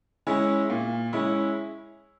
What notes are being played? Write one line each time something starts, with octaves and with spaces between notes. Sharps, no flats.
G#3 C#4 E4
A#2
G#3 C#4 E4